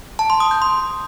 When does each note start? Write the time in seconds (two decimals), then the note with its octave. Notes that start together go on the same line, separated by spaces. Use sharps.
0.19 A5
0.30 C6
0.40 D#6
0.51 G6
0.62 C6